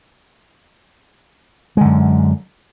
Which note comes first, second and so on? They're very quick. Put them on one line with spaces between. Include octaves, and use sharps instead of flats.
G#3 D3 F#2